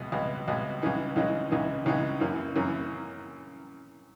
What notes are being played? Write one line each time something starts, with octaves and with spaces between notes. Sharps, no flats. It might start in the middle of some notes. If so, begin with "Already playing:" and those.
Already playing: C#2 B2 G#3
C#2 B2 G#3
C#2 B2 G#3
C#2 C#3 E3 G#3 D#4
C#2 C#3 E3 G#3 D#4
C#2 C#3 E3 G#3 D#4
C#2 C#3 E3 G#3 D#4
F#2 C#3 E3 A#3
F#2 C#3 E3 A#3